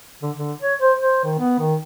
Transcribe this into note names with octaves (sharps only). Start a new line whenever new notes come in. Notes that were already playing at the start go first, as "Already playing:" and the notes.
D3
D3
C#5
C5
C5
D#3
B3
D#3